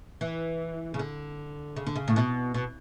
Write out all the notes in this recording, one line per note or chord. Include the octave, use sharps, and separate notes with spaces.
E3
C#3
D3
C#3
D3
C#3
A2
B2
B2